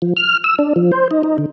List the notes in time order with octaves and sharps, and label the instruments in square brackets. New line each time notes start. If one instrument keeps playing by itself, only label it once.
[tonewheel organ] F3
F6
E6
D4
F3
C5
D#4
D#4
D3